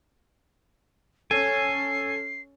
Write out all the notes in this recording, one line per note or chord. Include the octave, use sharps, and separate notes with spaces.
C#4 A4 G#5 C7